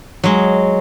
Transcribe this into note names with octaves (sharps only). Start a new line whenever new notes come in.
F#3 G#3